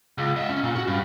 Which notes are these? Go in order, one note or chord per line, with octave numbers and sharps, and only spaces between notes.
C#2
D#5 E5
C#4
A#2
F#4
G2